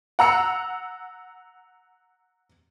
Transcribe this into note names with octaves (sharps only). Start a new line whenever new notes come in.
F#5 A#5 E6 C#7